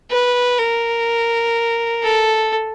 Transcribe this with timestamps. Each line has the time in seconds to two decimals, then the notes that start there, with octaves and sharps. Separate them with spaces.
0.11 B4
0.58 A#4
2.03 A4